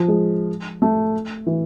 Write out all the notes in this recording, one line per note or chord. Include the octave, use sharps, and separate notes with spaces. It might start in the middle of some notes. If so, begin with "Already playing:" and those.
Already playing: F3
G#3
A3
E3